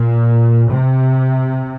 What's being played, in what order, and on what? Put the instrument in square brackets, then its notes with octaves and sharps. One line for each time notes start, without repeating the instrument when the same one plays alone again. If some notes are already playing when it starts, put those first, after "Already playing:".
Already playing: [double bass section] A#2
C3